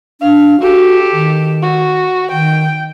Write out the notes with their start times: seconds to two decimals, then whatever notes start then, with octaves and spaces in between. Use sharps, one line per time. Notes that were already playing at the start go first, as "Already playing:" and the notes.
0.21 D4 F5
0.61 F#4 G4 A4
1.13 D#3
1.62 F#4
2.31 D#3 G5